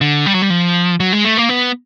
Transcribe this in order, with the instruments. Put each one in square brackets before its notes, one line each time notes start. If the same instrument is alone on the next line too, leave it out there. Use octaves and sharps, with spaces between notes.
[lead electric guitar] D3
G3
F#3
G3
F3
F#3
G#3
A3
A#3
B3